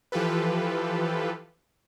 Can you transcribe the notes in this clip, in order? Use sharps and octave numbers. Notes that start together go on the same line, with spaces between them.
E3 F3 F4 G4 A4 B4